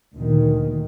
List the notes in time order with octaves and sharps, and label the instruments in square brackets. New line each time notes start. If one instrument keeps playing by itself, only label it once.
[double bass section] D2 A#2 D#3